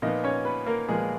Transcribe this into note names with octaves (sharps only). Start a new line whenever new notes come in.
A#2 F3 B3 D#4 D#5
C#4 C#5
B3 B4
A#3 A#4
A#2 F3 G#3 B3 G#4